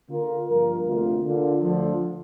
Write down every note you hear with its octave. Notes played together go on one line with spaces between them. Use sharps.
D3 A#3 F4 A#4
G2 F3 A#3 F4 A#4
D2 C3 A#3 F4
D3 A#3 F4
D2 D3 F3